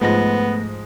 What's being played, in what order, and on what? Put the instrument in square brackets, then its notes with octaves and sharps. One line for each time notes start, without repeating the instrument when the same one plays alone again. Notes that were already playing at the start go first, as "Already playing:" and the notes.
[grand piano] G#2 F3 G#3 [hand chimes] A3 A#6 [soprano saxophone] B3